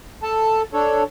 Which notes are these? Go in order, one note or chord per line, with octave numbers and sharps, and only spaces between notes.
A4 A5
D4 A4 C#5